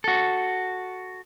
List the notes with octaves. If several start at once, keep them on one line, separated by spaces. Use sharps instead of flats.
F#4 A4